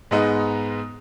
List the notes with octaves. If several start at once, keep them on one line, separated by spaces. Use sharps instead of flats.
G#2 G#3 B3 D#4